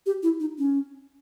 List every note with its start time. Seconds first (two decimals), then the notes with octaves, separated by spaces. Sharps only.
0.06 G4
0.23 E4
0.40 D#4
0.58 C#4